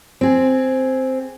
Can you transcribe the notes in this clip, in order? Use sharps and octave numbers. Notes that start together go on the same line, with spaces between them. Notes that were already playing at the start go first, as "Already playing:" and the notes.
C4 G#4